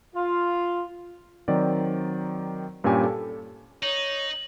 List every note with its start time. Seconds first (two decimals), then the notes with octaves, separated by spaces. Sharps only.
0.14 F4
1.48 D#3 F#3 C4 D5
2.84 G2 A#2 C#4 G4 G#5 D6
3.04 A4
3.83 D#4 C#5 F#7